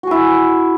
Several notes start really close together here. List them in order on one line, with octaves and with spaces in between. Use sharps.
F#4 G#4 E4